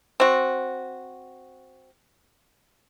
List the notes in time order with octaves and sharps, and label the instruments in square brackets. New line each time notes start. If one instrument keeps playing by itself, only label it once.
[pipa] C4 F#4